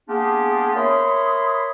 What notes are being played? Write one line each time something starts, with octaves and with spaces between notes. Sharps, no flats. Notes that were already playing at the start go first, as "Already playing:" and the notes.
A#3 B3 D4 F4 G4 G#4
A#4 C#5 E5 B5 C6 D#6